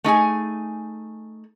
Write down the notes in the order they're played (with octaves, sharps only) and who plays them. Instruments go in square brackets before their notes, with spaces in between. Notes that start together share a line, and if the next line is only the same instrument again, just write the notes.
[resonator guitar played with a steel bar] A3 D#4 G#4 G#5